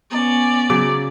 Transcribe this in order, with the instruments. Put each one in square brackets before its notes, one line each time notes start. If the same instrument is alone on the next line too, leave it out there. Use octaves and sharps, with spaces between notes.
[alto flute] B3 [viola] C#4 D5
[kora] C#3 F#3 [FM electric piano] D6